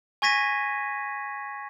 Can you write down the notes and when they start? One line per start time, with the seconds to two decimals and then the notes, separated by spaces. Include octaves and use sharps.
0.22 G#5 C#6 G#6 A#6 B6 D#7